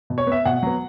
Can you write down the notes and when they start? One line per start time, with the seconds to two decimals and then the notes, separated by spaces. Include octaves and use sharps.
0.10 B2
0.18 C#5
0.27 B3 E5
0.45 B2 F#5
0.63 F#3 B3